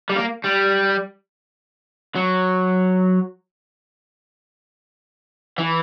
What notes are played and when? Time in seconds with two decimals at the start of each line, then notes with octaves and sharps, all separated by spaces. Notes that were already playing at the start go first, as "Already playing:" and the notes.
0.10 G3
0.16 A#3
0.45 G3
2.15 F#3
5.58 E3